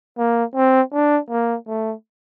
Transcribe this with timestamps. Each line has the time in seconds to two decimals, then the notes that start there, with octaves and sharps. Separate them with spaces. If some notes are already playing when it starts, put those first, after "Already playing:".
0.18 A#3
0.55 C4
0.93 D4
1.30 A#3
1.68 A3